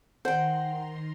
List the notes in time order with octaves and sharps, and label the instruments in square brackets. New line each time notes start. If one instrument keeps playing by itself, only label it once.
[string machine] D#3 A#5 C6 [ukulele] C5 [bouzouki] F#5 G5